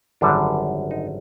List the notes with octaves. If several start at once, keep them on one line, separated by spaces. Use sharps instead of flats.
G#1 F#2 D3 G3 D4
D#4